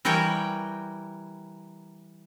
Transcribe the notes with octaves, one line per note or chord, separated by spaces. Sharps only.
E3 G3 A#4 C#5 G5